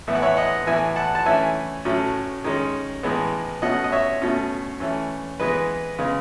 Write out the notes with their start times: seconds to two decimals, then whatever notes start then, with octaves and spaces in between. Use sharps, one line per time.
0.07 A2 E3 B3 E5
0.15 F#5
0.22 C#5 E5
0.37 D#5 F#5
0.67 A2 E3 B3 E5 G#5
0.96 F#5 A5
1.15 A5
1.26 E3 A3 C#4 E5 G#5
1.85 A2 F#3 A3 C#4
2.44 D#3 G#3 C#4
3.03 A2 E3 G#3 B3
3.62 B2 A3 C#4 D#5 F#5
3.84 D#5
3.92 C#5 E5
4.22 B2 A3 C#4
4.80 E3 A3 C#4
5.40 E3 G#3 B3 B4 D#5
5.99 C#3 G#3 B3